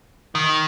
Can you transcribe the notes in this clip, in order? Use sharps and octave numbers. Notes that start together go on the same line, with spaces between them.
D#3